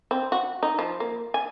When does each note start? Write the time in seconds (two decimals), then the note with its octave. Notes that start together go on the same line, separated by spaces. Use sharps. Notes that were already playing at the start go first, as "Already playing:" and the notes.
0.11 C4
0.32 F#4
0.63 D#4
0.79 F3
1.00 A#3
1.34 G#5